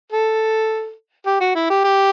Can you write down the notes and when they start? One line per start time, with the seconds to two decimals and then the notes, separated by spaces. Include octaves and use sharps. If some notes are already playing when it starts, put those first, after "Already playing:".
0.12 A4
1.26 G4
1.41 F#4
1.55 E4
1.70 G4
1.84 G4